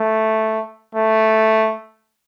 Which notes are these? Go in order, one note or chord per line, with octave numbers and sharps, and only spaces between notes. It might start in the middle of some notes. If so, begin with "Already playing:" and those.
Already playing: A3
A3